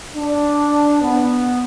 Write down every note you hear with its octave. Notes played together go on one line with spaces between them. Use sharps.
D4
B3